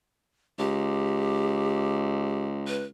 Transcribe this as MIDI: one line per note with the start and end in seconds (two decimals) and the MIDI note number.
0.59 2.87 37
0.59 2.46 67
2.67 2.86 71